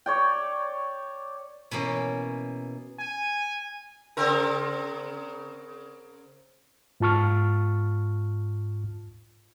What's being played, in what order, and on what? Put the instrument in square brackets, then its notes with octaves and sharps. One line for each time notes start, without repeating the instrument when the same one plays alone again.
[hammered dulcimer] C#5 D5 G5
[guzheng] B2 E3 A#3 C#4
[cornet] G#5
[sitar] C#3 C4 A#4
[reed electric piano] G#2 F4 A5 C#6 F6